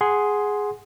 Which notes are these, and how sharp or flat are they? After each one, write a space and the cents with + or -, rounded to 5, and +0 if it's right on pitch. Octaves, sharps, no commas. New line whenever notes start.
G#4 +0 F#5 +0 C6 +0